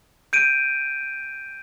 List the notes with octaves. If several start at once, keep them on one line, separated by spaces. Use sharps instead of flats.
G6 D7 D#7